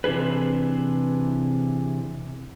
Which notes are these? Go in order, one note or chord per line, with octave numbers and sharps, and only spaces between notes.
C3 E3 D4 G#4 B4